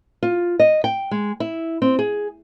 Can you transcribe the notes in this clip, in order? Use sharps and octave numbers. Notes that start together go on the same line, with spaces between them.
F4
D#5
G5
G#3
E4
C4
G#4